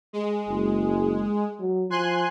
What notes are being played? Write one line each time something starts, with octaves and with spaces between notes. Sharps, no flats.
G#3
F#1
F#3
F3 G#5 C6 F#6